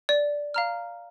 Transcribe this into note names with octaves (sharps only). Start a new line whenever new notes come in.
D5
F5 A#5 F6